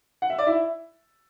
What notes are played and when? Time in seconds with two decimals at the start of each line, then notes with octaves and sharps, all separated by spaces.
0.22 F#5
0.30 E5
0.38 D5
0.47 E4 E5